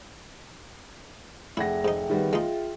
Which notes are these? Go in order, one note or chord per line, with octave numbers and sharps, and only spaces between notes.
F1 E4 G#4 E5 F#5 G5 A#6
G#2 D#4
D#3 G3 B3
G#3 D#4 F4